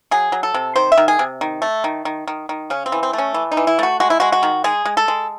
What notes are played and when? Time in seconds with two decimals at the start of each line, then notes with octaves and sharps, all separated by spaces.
0.11 F#3 G#4
0.32 F#3
0.43 A4
0.54 C3
0.76 D#3 C5
0.92 E5
0.98 D#3
1.08 G#4
1.19 C3
1.41 D#3
1.62 A3
1.84 D#3
2.05 D#3
2.28 D#3
2.49 D#3
2.70 C#3 C#4
2.86 C4
2.92 E3
3.03 C4
3.13 A3
3.18 C#4
3.34 E3
3.52 D#4
3.57 E3
3.67 E4
3.79 A3 F#4
4.00 G#3 F#4
4.10 E4
4.20 G#3 F#4
4.32 F#4
4.43 D#3
4.64 G#3 G#4
4.85 G#3
4.97 A4
5.08 G#3